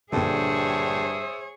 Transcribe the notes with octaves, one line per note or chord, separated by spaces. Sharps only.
A#1 G2 D3 G#4 C5 C#5 E5 D#6